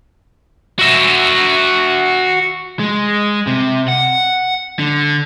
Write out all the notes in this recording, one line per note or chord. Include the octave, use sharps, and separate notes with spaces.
F#4 E5
G#3
C3
F#5
D3